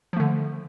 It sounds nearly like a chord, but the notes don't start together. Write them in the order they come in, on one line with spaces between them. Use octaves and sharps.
F3 A3 D3